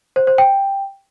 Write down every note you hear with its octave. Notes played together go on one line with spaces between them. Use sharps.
C5
C5
G5